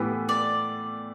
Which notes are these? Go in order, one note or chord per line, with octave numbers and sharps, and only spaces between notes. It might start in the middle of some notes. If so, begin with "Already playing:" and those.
Already playing: A2 E3 B3 G4 B4
D5